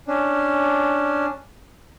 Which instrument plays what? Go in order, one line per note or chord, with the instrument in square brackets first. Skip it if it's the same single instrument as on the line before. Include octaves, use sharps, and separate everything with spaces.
[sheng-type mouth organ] C#4 D4